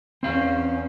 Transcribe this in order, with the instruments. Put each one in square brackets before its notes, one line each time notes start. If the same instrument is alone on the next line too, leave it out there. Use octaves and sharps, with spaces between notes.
[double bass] E2 C#4 [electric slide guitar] C4 F5